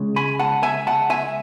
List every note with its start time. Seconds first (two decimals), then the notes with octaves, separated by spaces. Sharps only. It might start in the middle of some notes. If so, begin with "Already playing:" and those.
Already playing: C#2 C#3 G#3
0.16 G#5 B5
0.39 F#5 A5
0.63 E5 G#5
0.87 F#5 A5
1.10 E5 G#5